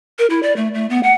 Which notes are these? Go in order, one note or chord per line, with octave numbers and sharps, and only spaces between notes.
A#4
E4
D5
A3
A3
B3
F#5